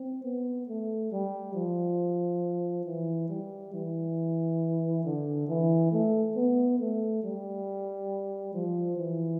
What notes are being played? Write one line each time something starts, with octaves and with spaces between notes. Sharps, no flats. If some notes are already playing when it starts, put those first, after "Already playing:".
Already playing: C4
B3
A3
G3
F3
E3
G3
E3
D3
E3
A3
B3
A3
G3
F3
E3